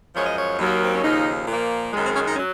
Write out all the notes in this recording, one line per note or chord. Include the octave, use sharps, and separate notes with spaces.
F#2 F3 G#3 C#5
D#5
C#5
D#2 D#3 F#3 A#3
C4
C#4
D#2 C#3 F3 D#4
A#2 F3 A#3
F#2 D#3 G#3
C4
C#4
D#4
C#4
F#3